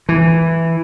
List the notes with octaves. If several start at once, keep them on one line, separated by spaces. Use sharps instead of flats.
E3